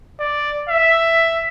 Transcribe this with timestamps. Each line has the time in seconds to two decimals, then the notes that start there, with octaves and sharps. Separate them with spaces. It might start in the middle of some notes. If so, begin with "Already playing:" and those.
0.20 D5
0.69 E5